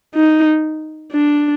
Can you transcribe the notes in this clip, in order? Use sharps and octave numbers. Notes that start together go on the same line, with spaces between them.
D#4
D4